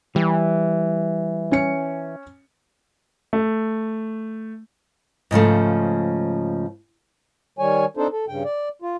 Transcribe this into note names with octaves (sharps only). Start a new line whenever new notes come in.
E3 G3
C#4 C#7
A3
G#2 C#3 F3 A3
D#3 G3 C#5 G#5
C4 D4 D#4 A4 C5
A4
G2 C#3 G5
D5
F4